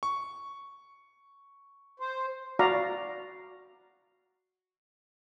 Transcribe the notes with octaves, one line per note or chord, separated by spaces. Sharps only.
C#6
C5
F#4 D5 F5 A#5